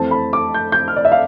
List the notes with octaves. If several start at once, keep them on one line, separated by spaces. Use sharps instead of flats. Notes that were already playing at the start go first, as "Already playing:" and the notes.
Already playing: F2 E3 A3 C4 A5
B5
D6
G6
G6
F6
D5
E5
F5